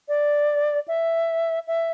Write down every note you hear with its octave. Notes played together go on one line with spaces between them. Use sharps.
D5
E5
E5